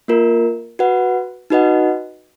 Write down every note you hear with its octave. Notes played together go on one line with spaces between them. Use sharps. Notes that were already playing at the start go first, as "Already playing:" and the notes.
A#3 F4 A#4
F#4 B4 F#5
D#4 F#4 B4 D#5 F#5